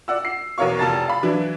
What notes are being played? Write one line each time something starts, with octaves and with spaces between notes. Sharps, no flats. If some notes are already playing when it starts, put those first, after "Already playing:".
D5 F#5 E6
C7
E2 B2 A#4 C#5 F5 C#6
F1 A5 A#5 A6
F5 B5
E3 F#3 D4 E4